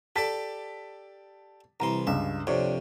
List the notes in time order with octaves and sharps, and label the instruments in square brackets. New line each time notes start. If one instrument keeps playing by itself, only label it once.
[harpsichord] G4 A4 D5 [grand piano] A5 B6
[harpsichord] C2 E3 C6 [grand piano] A#5
[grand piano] C#2 G2 [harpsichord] E5
[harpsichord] F2 C3 [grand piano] D4 C#5